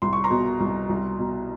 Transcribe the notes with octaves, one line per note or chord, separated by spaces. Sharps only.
C2 C6
C#6
A#5 C6
B2
C2
C2
B2